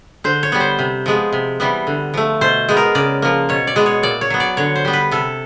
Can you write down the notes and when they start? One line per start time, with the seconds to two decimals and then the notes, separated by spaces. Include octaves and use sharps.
0.24 D3 C5
0.43 C#5
0.52 G3 B3
0.60 C5
0.79 C3
1.06 F3 G#3 B3
1.32 C3
1.60 E3 G3 B3
1.87 D3
2.14 F3 A3
2.41 B2 C5
2.69 G#3 B3
2.77 A#4
2.95 C#3 D5
3.22 F3 A#3
3.49 B2 C#5
3.67 D5
3.76 G#3 B3
3.86 C#5
4.03 A#2 D5
4.21 C#5
4.30 F#3 B3
4.40 D5
4.57 D3 C#5
4.76 C5
4.85 G3 B3
4.93 B4
5.11 C3 A4